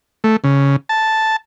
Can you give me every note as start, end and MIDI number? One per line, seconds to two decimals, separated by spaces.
0.24 0.36 57
0.44 0.76 49
0.89 1.36 81